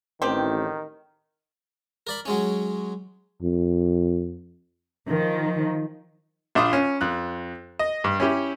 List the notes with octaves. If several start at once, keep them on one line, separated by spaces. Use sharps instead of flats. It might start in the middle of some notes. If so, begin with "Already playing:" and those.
A1 D#3 C4 G4
A#4 D5 B5
F#3 G#3 C#4
F2
D#3 F3
A#1 D4 F4 D#6
C#4
F2 F#6
D#5
G2
C#4 E4 G4